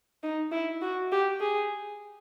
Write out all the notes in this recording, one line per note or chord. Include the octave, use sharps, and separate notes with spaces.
D#4
E4
F#4
G4
G#4